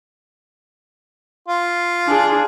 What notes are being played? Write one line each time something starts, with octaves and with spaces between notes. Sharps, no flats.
F4
D4 G#4